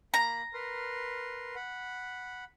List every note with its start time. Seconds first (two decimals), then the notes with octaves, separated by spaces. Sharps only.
0.14 A#3 A#5 B5
0.54 A#4 B4 C6
1.55 F#5 B5